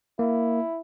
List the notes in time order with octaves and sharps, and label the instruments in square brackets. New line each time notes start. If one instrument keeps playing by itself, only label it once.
[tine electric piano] A#3 [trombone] E4